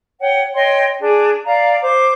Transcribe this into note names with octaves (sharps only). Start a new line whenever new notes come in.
C#5 F#5 G5
C#5 D#5 G5 C6
D4 G#4
D5 F5 A#5
C5 D6